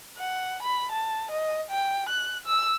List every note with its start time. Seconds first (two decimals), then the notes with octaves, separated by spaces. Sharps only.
0.18 F#5
0.63 B5
0.92 A5
1.32 D#5
1.71 G5
2.10 F#6
2.46 E6